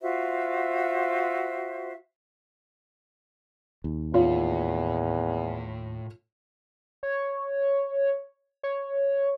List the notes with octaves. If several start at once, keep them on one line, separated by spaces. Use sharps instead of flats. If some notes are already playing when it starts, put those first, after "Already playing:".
F4 F#4 C5 E5
D#2
E2 A2 F4 C#5
C#5
C#5